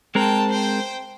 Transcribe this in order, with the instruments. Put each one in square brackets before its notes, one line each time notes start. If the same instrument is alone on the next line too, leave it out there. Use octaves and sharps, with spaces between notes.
[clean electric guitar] G#3 C4 A#4 [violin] G5 A5
[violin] C5 G5